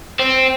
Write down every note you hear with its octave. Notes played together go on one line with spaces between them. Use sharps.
C4